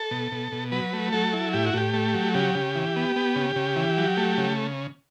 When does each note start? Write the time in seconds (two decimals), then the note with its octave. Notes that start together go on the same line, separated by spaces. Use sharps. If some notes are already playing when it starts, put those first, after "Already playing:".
Already playing: A4
0.11 B2
0.32 B2
0.52 B2
0.72 F#3 B4
0.93 A3
1.13 F#3 A4
1.33 E4
1.53 A2 G4
1.66 F#4
1.74 A2 G4
1.94 A3
2.14 F#3
2.34 C#3 G4
2.55 C#3
2.75 E3
2.96 B3
3.16 B3
3.36 C#3
3.56 C#3
3.76 E3
3.97 F#3
4.17 A3
4.38 C#3